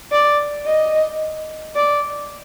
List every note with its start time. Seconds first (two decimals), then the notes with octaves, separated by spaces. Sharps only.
0.12 D5
0.67 D#5
1.76 D5